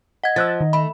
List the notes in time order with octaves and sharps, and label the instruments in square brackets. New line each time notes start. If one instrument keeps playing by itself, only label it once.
[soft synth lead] D#5 [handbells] F#5 G#6
[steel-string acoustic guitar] F3 [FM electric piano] E6 F#6 A6
[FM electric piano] D#3
[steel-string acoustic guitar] A3 [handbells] B5